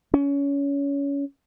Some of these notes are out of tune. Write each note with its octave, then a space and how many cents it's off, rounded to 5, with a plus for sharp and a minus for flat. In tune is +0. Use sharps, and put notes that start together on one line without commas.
C#4 +25